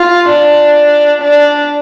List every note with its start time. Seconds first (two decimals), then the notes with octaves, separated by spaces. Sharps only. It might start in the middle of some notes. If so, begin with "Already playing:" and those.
Already playing: F4
0.29 D4
1.22 D4